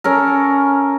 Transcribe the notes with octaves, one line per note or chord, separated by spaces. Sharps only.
C#4 A4 A#4